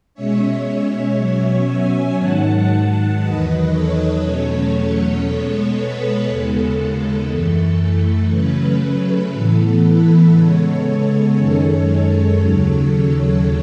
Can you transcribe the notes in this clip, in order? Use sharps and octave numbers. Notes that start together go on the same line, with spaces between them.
B2 G#3 C#4 C#5 E5
B2 F#3 C#4
E5 G#5
G#2 D#3 F#3 F#5 A5
E2 D#3 F#3 B4 D#5
A4 C#5
E2 B2 F#3 A3 C#4 A4 C#5
B2 G#3 B3 A4 C#5
B4
D#2 C#3 G#3 B3 A4
F#2 E3 A3 A4
A4
C#3 F#3 A3 C#4 B4
B4
A2 E3 B3 A4
B4
C#3 G#3 B3 A4 C#5
A4 C#5
F#2 D#3 G#3 C#4 A4 C#5
D#2 C#3 F#3